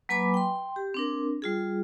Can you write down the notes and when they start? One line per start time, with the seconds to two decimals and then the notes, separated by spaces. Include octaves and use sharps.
0.09 F#3 A#3 B4 G#5 B5 D6
0.34 G5 C6
0.76 G4
0.94 C4 D4 A#4
1.42 G3 F4 G#4